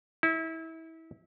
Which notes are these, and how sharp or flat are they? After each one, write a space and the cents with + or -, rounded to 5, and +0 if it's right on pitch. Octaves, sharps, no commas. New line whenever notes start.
E4 -25